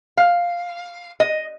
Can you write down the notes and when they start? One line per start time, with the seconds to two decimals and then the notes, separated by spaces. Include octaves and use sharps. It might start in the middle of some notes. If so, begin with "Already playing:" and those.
0.17 F5
1.20 D#5